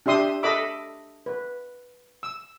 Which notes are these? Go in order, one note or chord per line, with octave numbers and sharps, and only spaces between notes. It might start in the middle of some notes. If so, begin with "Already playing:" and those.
D4 G4 E5 C6 D#6
A4 D#5 E5 B5 D6 E6
B4
E6